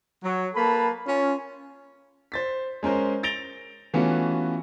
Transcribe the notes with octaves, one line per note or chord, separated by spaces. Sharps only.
F#3
A#3 A4 B4 A5 B5
C#4 F4
C5 A6 B6
G#3 C#4 A#4 C5
A6 A#6 D7 F7 G7
E3 A3 B3 C#4 F4 F#4